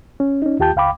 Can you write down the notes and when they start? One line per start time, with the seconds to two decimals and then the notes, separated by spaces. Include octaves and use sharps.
0.20 C#4
0.42 C#4 D#4
0.60 D#2 F4 G4 G5 A5 G6
0.76 C#2 F5 G5 B5 D6